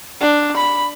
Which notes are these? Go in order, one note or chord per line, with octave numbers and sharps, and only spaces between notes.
D4
B5